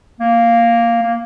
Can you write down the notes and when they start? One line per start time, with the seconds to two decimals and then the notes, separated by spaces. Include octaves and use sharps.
0.20 A#3
1.03 A#3